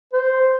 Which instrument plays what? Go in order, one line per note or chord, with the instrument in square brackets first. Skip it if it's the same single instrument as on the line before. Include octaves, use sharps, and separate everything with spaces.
[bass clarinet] C5